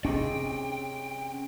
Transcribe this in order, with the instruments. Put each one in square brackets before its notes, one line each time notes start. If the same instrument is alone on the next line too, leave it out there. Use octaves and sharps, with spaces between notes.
[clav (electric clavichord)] C3 D#4 G#4 [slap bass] C#4 [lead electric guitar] G5